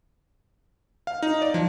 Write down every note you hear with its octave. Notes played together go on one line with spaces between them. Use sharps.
F5
D#4
D5
F3